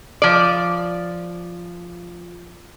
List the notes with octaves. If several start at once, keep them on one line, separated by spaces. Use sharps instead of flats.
F3 D5